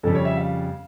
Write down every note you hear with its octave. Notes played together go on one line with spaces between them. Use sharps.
F2 C#3 G3 A4
C#5
E5
F5